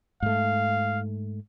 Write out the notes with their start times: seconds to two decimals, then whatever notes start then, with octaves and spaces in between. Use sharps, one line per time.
0.22 G#2 A3 F5